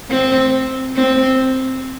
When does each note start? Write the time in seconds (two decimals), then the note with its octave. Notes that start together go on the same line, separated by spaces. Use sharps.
0.10 C4
0.96 C4